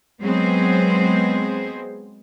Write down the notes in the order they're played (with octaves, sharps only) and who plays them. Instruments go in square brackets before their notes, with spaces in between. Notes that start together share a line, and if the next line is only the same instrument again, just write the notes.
[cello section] F#3 G#3 B3 C4 G#4 C5